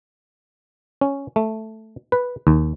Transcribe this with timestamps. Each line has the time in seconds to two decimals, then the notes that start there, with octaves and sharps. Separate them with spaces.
1.01 C#4
1.36 A3
2.12 B4
2.47 D#2